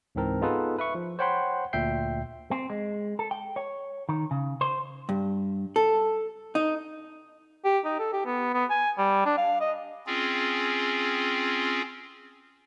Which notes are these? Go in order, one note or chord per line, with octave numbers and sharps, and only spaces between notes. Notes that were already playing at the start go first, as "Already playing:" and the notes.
C#2 G#2 E3 C4 A#4 A5
B3 D#4 F4 G#4 A4 B4
B4 E5 C#6
F3
C5 C#5 F#5 G5 B5 C6
D2 A#2 E5 G5 G6 C7
C4
G#3
A4
G5
C#5
D#3
C#3
C5
G2
A4
D#4
G4
D#4
A4
G4
B3
B3
G#5
G3
D4
F5
D#5
C4 C#4 F4 G#4